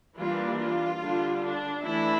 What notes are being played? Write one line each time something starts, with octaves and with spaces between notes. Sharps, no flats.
E3 G3 A#3 D4 F4
F4
D3 G3 D4
D4
E3 A3 D4 E4